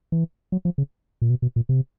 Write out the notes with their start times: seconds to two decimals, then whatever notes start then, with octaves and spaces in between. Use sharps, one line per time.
0.12 E3
0.52 F#3
0.65 F3
0.78 C#3
1.22 A#2
1.30 B2
1.42 B2
1.56 A#2
1.69 C3